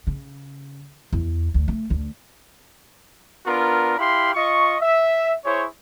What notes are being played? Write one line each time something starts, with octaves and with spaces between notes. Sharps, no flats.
C#3
E2
D2
A3
D2
B3 D4 F4 A#4
E4 G4 F5 B5 C6
F4 D#5 C#6
E5
E4 G#4 C5 C#5